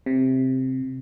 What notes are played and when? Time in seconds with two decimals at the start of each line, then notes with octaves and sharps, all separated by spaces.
0.06 C3